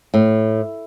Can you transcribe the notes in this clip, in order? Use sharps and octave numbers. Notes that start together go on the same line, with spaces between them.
A2